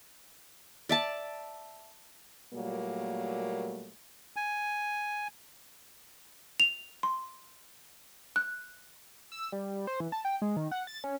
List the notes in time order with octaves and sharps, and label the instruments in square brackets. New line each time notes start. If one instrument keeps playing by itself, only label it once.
[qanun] D5 E5 A5
[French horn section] A#2 F#3 G3 A3 A#3
[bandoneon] G#5
[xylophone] F7
C6
F#6
[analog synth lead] E6
G3
C5
E3
A5
G5
G#3
D#3
F#5
A6
C#4